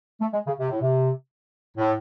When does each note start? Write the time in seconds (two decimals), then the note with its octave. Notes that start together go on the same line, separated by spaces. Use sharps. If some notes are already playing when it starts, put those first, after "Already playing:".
0.21 A3
0.33 G#3
0.47 C#3
0.59 C3
0.71 A2
0.81 C3
1.77 A2